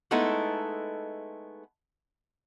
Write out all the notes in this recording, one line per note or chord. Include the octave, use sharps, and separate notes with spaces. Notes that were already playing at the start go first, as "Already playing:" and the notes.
G#3 A3 B3 D#4 E4 A4